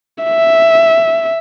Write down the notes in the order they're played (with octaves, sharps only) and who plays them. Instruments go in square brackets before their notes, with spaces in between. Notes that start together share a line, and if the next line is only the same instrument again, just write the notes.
[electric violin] E5